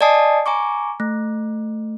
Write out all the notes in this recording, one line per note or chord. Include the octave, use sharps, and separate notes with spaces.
D5 D#5 G#5 A5 D#6 C7
G#5 A#5 C#6 D6
A3